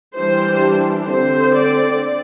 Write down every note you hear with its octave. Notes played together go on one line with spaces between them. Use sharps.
E3 G3 D4 C5
D3 C4 C5
D5